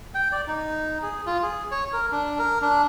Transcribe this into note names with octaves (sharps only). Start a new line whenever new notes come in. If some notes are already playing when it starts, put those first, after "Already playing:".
G5
D5
D#4
G#4
F4
G#4
C#5
A#4
D4
A#4
D4